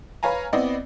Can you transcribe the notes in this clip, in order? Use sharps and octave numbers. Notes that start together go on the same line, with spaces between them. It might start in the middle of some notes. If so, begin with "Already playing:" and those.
B4 C#5 F5 G#5 A#5
B3 C4 E4 D5 D#5